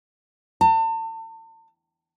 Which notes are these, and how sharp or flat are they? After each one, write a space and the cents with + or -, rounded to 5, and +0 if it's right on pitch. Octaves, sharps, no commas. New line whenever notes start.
A5 +40